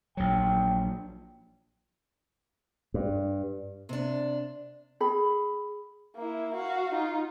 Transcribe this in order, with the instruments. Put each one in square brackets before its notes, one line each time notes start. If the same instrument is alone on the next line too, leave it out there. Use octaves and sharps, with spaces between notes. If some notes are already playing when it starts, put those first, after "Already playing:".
[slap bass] A#1 F#3 [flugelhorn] G5
[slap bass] G2
[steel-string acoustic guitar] C3 D4
[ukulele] G#4 B5
[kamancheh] A#3 E4
F#4 F5
D#4 F4